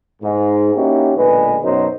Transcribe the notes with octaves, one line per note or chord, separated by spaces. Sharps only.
G#2
A#3 C#4 D#4 E4 F#4 G4
B1 A#2 D3 G#3 B4
F#2 B2 F#3 D#4 A#4 C5